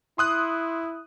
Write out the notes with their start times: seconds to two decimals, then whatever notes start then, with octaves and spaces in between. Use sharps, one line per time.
0.18 E4 C6 D#6 F#6